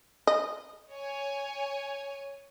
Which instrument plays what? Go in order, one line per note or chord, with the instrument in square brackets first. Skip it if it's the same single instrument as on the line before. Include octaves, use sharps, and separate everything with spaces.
[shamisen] D#5
[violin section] C#5 G#5